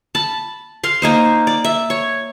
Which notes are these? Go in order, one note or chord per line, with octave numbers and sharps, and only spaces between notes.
A5 B5
F5 C6
A#3 D#4 C5
D5
E5
C#5